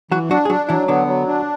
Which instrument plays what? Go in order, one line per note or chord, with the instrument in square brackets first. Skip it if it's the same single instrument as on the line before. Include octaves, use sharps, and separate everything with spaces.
[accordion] E3 [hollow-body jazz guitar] F#3 F#4
[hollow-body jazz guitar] F#3 F#4 [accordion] D4
[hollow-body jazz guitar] G#4
[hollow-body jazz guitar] F#3 F#4 [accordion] D4
[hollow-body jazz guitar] E3 E4 [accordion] F#3
[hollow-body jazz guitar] D3 D4 [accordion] B3
[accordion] F#3
D4